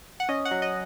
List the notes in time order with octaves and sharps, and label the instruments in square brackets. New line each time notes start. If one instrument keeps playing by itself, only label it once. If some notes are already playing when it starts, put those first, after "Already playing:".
[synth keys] F#5
C#4 D#5
F#5
F#3
D#5